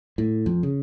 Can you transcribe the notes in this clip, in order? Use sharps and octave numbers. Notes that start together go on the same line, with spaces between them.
A2
F2
C#3